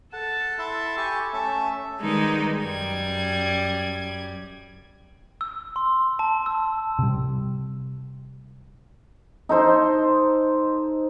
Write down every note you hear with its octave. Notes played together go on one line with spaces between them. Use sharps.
A4 F#5 A5
E4 E5 C6
G4 G#5 C#6
A3 C#4 E5
D#3 G3 G#3 B3 D#4
F#2 G3 G#6
E6
C6
A5
E6
C3 G3
D#4 A4 C5 C6